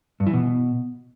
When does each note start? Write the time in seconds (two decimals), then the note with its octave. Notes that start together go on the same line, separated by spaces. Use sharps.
0.20 G2
0.27 E3
0.33 B2